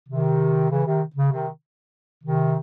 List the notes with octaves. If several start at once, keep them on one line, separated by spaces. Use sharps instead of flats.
C3 D#3
C#3 E3
C3 D#3
C#3
C3 D#3
C3 D#3